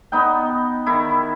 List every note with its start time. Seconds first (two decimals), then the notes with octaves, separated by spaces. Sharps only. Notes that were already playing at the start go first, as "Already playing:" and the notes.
0.12 B3 D#4 G5
0.86 D#3 E4